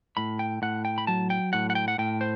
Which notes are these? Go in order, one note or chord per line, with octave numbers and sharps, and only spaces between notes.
A2 B5
G5
A2 F#5
G5
B5
F#3 A5
G5
A2 F#5
F#5
G5
F#5
A2 G5
C5